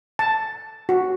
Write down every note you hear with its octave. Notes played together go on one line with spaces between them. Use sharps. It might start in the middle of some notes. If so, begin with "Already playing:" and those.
A5
F#4